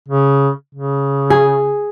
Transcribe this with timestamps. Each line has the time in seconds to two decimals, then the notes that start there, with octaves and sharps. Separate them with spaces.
0.08 C#3
0.74 C#3
1.30 G#4